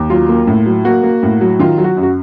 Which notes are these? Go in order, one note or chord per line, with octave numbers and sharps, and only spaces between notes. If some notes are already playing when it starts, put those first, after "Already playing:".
Already playing: D#2
F#3 F4
A#3
A2
F#3
A#3 F#4
A#3
A2
F#3
D#3 F4
F#3
F#4
F#2
F#4